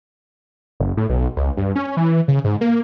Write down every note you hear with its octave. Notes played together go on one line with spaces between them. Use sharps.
F#1
A2
B1
C#2
G2
C#4
E3
C#3
G#2
A#3